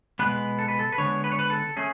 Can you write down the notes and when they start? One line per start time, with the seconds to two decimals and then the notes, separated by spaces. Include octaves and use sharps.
0.19 B2 G#3 B3 B4
0.58 A4
0.68 B4
0.79 A4
0.92 B4
0.98 D3 G#3 B3 C#5
1.24 B4
1.32 C#5
1.39 B4
1.50 A4
1.76 A3 C#4 G#4